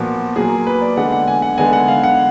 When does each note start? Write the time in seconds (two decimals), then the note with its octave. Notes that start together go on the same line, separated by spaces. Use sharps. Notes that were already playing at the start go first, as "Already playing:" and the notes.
Already playing: A#2 F3 B3 F#4
0.36 A#2 F#3 A#3 G#4
0.67 B4
0.82 D5
0.97 D3 G#3 B3 F#5
1.12 F#5
1.28 G#5
1.42 F#5
1.58 D3 G#3 B3 G#5
1.73 F#5
1.88 F5
2.04 F#5